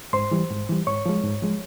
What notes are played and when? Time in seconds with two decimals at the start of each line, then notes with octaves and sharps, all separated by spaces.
0.13 G#2 C5 C6
0.31 E3 G3
0.51 G#2
0.69 E3 G3
0.87 G#2 C#5 C#6
1.06 F3 G#3
1.24 G#2
1.42 F3 G#3